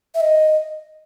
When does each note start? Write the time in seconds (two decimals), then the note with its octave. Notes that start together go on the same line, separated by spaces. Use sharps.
0.15 E5
0.21 D#5